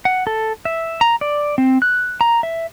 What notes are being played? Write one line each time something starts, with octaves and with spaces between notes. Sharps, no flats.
F#5
A4
E5
A#5
D5
C4
F#6
A#5
E5